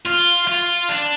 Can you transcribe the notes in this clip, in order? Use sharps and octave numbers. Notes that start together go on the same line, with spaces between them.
F4
F4
D4